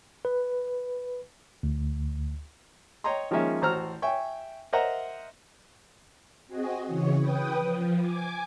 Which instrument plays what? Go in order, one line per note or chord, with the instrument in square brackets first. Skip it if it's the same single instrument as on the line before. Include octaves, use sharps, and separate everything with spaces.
[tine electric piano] B4
D2
[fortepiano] C#5 D#5 G5 A#5 C6
D#3 F3 G#3 A#3 C#4 E5
A1 F#4 C5 A#5 F6
E5 G5 G#5 C#6
A#4 C5 D#5 E5 F#5 A#5
[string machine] C4 F#4 G#4 D#5
C#3 E3 C#5
B4 G5 D#6
F3
G#5 D6